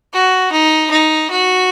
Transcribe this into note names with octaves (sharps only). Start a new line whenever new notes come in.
F#4
D#4
D#4
F#4